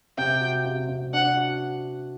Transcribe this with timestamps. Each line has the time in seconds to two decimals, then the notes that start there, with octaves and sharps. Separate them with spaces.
0.18 C3 G5
0.41 F#4
0.65 C3
0.89 C3
1.13 D4 F#5
1.37 F#4